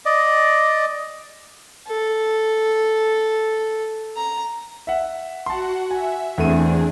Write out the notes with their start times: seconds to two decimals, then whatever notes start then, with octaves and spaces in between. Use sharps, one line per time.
0.05 D5 D#5
1.87 A4
4.16 A#5
4.87 E5 F#5
5.46 F#4 F#5 A5 C6
5.91 E5 G#5
6.38 E2 A3 C4 D4 G#4 D#7